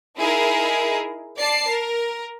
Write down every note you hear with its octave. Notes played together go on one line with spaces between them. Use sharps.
D#4 E4 G#4 A#4
D5 A5 C7
A#4